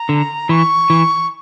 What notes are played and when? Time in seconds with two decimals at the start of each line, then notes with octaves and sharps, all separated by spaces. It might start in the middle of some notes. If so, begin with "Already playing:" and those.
Already playing: A#5
0.09 D3
0.49 E3 C#6
0.90 E3